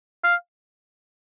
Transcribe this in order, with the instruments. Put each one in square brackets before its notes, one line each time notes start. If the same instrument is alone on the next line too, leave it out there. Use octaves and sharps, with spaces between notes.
[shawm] F5